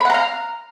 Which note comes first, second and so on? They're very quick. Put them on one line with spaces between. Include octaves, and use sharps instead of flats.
B5 F#5 A#5 F5